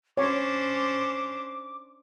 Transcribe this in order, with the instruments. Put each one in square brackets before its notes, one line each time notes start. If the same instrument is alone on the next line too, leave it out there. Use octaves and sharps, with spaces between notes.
[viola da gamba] C#4 D4 C5 [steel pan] C#5 [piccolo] D6